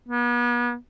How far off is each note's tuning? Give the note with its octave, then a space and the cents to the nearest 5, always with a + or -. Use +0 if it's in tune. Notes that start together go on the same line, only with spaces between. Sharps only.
B3 -40